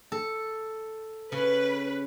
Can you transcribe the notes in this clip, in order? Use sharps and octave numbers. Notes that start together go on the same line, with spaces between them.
A4
C#3 B4